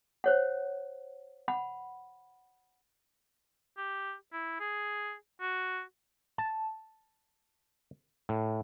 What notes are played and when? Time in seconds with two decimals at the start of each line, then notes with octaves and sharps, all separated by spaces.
0.24 C5 C#5 F#5
1.48 F#5 B5
3.77 G4
4.33 E4
4.60 G#4
5.41 F#4
6.38 A5
8.29 A2